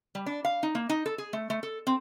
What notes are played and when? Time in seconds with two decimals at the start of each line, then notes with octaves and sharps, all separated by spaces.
0.15 G3
0.26 D4
0.45 F5
0.63 D#4
0.75 A#3
0.89 D#4
1.06 A4
1.18 G#4
1.33 A3
1.50 A3
1.63 A4
1.87 C4